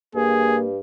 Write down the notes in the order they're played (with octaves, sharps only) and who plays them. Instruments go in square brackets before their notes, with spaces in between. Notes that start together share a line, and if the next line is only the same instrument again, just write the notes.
[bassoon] G2 [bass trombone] A#3 [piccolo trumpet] G#4